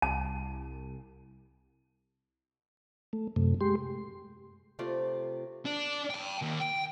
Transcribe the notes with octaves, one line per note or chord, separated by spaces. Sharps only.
C2 A5
A3
F#2 C3 A3
G#3 G4 C6
C3 A3 F4 D5
D4
G5 A5
D#2
G5